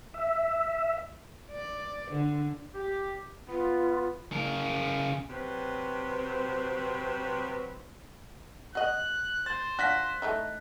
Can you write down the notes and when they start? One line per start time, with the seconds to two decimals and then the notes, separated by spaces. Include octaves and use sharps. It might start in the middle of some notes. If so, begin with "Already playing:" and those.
0.14 E5
1.52 D5
2.11 D3
2.74 G4
3.48 B3 F4
4.32 C#3 A#4
5.30 C3 F#3 C4 B4 C5
8.75 F#4 D#5 F#6
9.46 C5 A6
9.79 D4 F4 F#4 F#6 A#6 B6
10.22 A3 D#4 E4